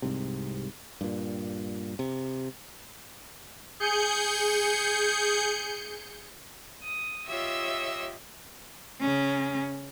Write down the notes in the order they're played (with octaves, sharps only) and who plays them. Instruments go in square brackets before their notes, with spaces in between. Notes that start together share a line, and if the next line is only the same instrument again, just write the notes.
[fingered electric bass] C2 G#2 C3
G2 A#2
C3
[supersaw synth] G#4 G6 C#7
[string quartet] D#6
F4 G4 C#5 D#5 E5 E6
[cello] C#3 C#4